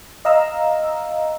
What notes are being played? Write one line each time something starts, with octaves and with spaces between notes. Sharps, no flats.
D#5 F5 A#5 E6